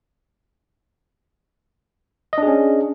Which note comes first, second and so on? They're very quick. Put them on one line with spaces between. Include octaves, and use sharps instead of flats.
D#5 D4 G#4 C#4